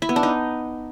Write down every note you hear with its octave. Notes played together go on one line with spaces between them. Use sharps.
E4
B3
D4
D#4